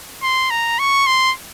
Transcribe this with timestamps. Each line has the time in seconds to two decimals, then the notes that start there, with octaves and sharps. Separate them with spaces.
0.23 C6
0.50 A#5
0.79 C#6
1.07 C6